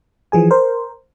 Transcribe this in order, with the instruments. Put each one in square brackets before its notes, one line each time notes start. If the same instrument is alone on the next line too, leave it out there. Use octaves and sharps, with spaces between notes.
[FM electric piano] E3 F3 G#4 G#5
A#4 C5